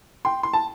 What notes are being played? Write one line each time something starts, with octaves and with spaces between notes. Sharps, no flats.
G5 C6
C6
A5